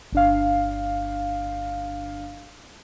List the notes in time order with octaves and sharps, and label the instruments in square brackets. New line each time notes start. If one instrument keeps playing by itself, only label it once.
[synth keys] G1 D4 F5